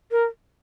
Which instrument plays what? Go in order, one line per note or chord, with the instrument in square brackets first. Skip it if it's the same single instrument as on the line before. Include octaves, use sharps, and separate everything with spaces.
[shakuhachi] A#4